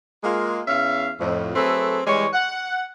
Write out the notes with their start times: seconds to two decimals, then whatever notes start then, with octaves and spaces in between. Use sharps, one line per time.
0.24 G#3 A#3 F4
0.68 E2 C#4 E5 F5
1.20 F2 A2
1.55 F#3 A3 C4 G#4 A4 B4
2.07 E3 G3 G#3 C#5
2.33 F#5